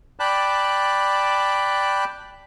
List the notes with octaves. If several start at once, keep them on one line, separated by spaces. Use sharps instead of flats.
D5 G5 A5 B5 F#6